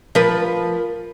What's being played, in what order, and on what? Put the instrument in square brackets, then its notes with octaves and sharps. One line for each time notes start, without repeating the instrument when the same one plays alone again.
[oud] F3 A#4 B4